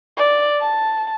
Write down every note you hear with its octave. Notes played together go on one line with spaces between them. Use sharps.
D5
A5